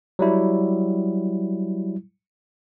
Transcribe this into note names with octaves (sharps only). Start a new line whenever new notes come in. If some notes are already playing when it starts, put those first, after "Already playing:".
F#3 G3 E4